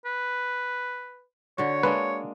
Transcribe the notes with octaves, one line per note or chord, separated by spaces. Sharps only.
B4
D3 F#4 C#5
G#3 A#3 D4 B4